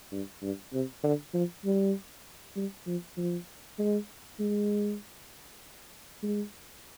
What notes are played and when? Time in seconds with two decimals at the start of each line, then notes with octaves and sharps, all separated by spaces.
0.12 G2
0.42 G2
0.73 C3
1.04 D3
1.34 F3
1.65 G3
2.56 G3
2.87 F3
3.18 F3
3.79 G#3
4.40 G#3
6.23 G#3